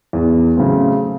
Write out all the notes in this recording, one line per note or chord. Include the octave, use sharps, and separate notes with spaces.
E2
C#3 F#3 A3 C4